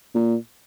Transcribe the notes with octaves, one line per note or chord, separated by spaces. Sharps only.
A#2